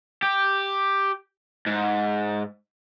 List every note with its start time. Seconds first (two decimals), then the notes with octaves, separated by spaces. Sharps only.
0.22 G4
1.66 G#2